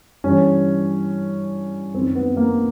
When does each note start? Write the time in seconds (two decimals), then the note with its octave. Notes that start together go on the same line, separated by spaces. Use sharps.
0.24 G2 E3 C#4
1.94 F#2 C4
1.98 D#3
2.15 B3
2.37 A#3